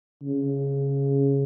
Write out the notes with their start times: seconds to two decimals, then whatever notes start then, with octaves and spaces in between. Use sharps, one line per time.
0.23 C#3